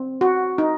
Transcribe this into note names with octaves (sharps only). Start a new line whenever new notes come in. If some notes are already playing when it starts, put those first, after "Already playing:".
Already playing: C4
F#4
D#4